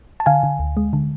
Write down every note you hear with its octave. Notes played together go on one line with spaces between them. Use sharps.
A5
D3 F5 G#5
D3
D2
G#3
D3